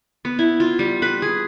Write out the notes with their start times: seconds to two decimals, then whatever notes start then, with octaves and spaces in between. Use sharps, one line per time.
0.25 B3
0.39 E4
0.60 F4
0.79 G3
1.02 B4
1.22 G#4